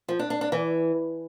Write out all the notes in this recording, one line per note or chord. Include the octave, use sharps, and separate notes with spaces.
F3
D4
D4
D4
E3